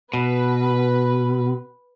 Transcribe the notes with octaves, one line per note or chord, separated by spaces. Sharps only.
B2 B4